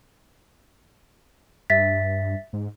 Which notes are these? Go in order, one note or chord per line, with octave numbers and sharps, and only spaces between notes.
G2 E5 A6 B6
G#2